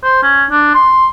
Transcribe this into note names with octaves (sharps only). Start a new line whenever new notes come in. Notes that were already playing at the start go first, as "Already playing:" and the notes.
C5
C#4
D4
C6